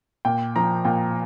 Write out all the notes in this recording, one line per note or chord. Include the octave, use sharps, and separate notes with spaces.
A#2 G5
F3 A#5
A#2 G5